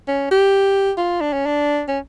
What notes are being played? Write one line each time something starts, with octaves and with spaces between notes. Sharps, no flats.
C#4
G4
F4
D4
C#4
D4
C#4